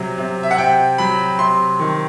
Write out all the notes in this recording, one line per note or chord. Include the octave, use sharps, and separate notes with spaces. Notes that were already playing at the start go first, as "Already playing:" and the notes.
Already playing: C3 F#3
C3
E5
F#5
C3 G5
F#3 B5
C3 C6
D#3